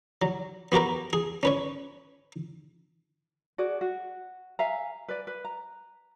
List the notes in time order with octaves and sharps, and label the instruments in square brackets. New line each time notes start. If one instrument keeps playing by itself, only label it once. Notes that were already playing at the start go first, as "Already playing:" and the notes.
[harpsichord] F#3
B3 F#4 G4 A#4 B4
G#4
C#4 B4 C#5
[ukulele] F#4 G#4 D5
F#4
E5 F5 G#5 A#5
B4 D5
B4
A#5